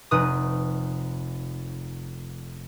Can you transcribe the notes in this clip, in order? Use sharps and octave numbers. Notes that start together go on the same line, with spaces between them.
F1 D#4 B4 D#6